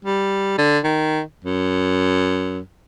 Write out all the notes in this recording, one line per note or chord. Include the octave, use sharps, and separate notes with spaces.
G3
D3
D#3
F#2